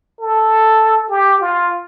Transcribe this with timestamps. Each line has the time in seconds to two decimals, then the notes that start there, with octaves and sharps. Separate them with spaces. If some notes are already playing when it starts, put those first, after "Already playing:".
0.21 A4
1.10 G4
1.41 F4